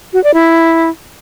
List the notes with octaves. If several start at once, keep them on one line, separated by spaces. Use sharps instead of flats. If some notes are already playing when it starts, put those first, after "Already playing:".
F#4
D5
E4